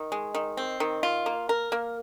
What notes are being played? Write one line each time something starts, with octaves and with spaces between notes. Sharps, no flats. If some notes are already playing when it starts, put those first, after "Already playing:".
Already playing: D#3
G#3
D#3
C4
D#3
F4
A#3
A#4
A#3